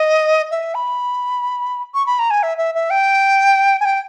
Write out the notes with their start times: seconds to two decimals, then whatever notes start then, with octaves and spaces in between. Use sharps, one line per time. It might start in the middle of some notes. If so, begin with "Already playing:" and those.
Already playing: D#5
0.51 E5
0.75 B5
1.94 C#6
2.06 B5
2.19 A#5
2.30 G#5
2.43 E5
2.58 E5
2.75 E5
2.90 G5
3.81 G#5
3.85 G5